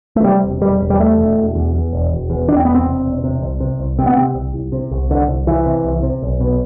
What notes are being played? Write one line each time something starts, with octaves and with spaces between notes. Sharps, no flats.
A3
C3 G3
E1
E1 G3
E1
G3
E2 A3
E1
E1
E2
E2
E1
E1
E2
E2 D4
C4
E1 B3
C4
C3
E1
C3
C2
C3
C2
C3 C4
B3
C4
C3
C2
C2
C3
C2
C2 D3
C2
C2 E3
C3
C2
C3
B1
B2